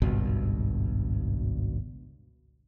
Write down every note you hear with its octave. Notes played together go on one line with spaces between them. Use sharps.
G#1 C#2 G2 B2